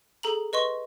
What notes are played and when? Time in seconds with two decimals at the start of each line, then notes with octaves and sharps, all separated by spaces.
0.23 G#4 A4 A#5 F#7
0.53 B4 D#5 C6 C#6